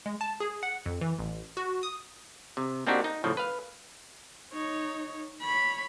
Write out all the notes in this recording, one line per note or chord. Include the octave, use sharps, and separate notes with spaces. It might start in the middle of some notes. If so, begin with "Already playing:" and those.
G#3
A5
G#4
F#5
F2
E3
A1
F#4
D#6
C3
A#3 C4 D4 D#4 F#4 G4
D#4
A2 C#3 F3
B4 F5
D#4 C#5
C#5 B5